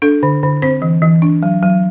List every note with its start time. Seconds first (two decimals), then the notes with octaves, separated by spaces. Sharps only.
0.02 D4 A4
0.23 D3
0.43 D3
0.62 C4 C5
0.82 E3
1.02 E3
1.22 D4
1.43 F#3
1.63 F#3